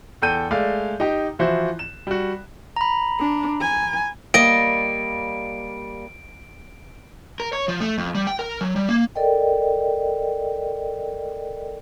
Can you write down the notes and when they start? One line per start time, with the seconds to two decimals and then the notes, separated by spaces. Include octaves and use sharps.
0.22 E2 A4 G5 G6 D#7
0.51 G#3 A3 D5 F5
1.00 D#4 G4
1.39 E3 F3 E4 F#4 C5
1.79 E7
2.07 G3 F#4
2.76 A#5 B5
3.20 D4
3.61 G#5
4.34 G3 A#3 D5 D#5 D7
7.40 A#4
7.53 C#5
7.68 F3
7.80 A3
7.98 F2
8.15 G3
8.27 G5
8.39 A#4
8.61 F#3
8.76 G3
8.89 A#3
9.15 A4 A#4 D5 D#5 G5